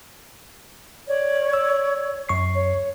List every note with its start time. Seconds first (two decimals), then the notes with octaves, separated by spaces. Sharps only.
1.08 C#5 D5
1.53 E6
2.29 F#2 C#6 C7
2.54 C#5